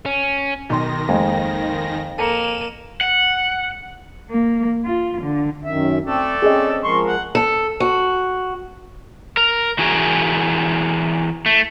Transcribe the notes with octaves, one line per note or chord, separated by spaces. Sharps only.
C#4
B1 D#3 C6 A#6
F2 G#3 A#3
A#3 A4 A#5 C#7 D#7 E7
F#5
A#3
F4
D3
F#2 D#3 E5
A3 C4 A4 D5
C4 C#4 G#4 D#5
F3 G#3 A#4 C6 C#6
F#5
A4
F#4
A#4
E3 F#4 G#4 A#4
A3